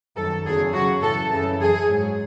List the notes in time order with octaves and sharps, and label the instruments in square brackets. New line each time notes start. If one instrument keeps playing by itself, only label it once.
[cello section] F#2 D#3 F#3 A4
E2 C#3 F#3 G#4
F#2 C#3 F#3 F#4
A2 E3 A4
F#2 C#3 E3 A4
F#2 E3 G#4
G#2 F#3